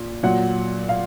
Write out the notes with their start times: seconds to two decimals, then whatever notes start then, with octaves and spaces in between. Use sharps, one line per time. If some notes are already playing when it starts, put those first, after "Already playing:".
Already playing: A#2
0.23 A#2 F#3 F#5
0.89 F5